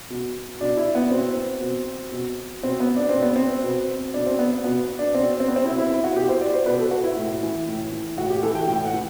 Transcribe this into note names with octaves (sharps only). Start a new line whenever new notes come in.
B2
B2 D4
E4
B3
B2 C4
B2
B2
B2 C4
B3
D4
B2 C4
B3
C4
B2
B2 D4
C4
B3
B2 B3
D4
B2 C4
C4
B3
C4
B2 E4
E4
E4
F#4
B2 G4
C5
D5
C5
B2 B4
A4
F#4
E4
A2
E3
A2
E3
A2 F#4
G4
E3 A4
G5
A2 G5
F#5
E3